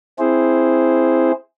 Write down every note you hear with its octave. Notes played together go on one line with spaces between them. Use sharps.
C4 E4 G#4 C5